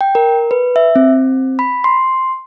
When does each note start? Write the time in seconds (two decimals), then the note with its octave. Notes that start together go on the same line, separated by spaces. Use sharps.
0.01 G5
0.15 A#4
0.51 B4
0.76 E5
0.96 C4
1.59 B5
1.84 C6